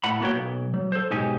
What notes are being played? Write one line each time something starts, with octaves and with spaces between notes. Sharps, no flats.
A2 F#5 B5
A#3 B3 F#4 C#5 G5
B1
F#3
A4 C5
B1 G#2 D#4 G4 G#5